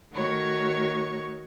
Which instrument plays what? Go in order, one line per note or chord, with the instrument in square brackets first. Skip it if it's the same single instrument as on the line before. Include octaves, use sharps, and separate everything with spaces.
[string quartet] D#3 A3 F#4 C#5 C#6